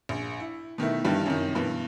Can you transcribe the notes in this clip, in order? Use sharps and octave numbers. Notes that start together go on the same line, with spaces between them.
A#1
E4
B2 D#3 A3 E4
G2 D#3 E3 G3
F#2 C3 D#3
G2 B2 E3